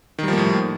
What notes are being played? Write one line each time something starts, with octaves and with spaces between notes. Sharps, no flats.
A2 D#3 F3 G3 A#3